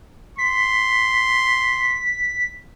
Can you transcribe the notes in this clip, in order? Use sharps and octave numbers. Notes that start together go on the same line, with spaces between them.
C6 B6